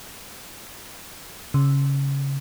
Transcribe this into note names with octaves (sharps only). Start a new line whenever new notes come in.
C#3